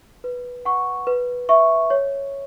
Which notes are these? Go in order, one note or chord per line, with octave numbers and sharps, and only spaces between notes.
B4
F#5 C#6
B4
E5 C#6
C#5